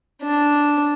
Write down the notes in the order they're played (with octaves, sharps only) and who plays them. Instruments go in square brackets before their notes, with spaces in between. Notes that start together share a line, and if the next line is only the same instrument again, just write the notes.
[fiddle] D4